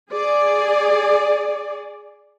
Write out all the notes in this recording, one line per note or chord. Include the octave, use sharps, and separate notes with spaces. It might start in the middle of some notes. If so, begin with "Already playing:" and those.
G#4 D5